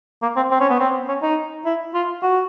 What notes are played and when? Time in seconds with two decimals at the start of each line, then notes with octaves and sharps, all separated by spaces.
0.22 A#3
0.36 C4
0.51 C4
0.60 C#4
0.70 B3
0.79 C4
1.08 C#4
1.22 D#4
1.65 E4
1.94 F4
2.23 F#4